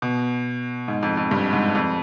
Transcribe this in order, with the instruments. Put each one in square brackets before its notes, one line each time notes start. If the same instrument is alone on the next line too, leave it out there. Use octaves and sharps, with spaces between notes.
[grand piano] B2
G#2
F2
F2
G2
G#2
F2